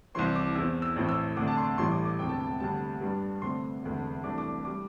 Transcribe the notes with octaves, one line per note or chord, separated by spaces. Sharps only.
C2 C3 E3 C4 C6
D6
E2 E3 C4 E6
E6
A1 A2 E3 C4
E6
D2 C3 A3 D4 D6
A5
C6
A1 A2 E3 G3 C6
D6
D6
E1 D2 C3 G5
A5
G5
D2 C3 G3 A5
G2 G3 D4
D2 C3 A3 C4 C6
E1 D2 C3 A3
C2 C3 E3 A3 D4 D6
D6
G3 D6